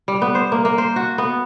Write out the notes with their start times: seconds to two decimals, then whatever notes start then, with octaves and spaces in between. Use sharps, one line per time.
0.08 G3
0.22 B3
0.35 C5
0.52 A#3
0.65 A#3
0.78 C5
0.96 F#4
1.18 B3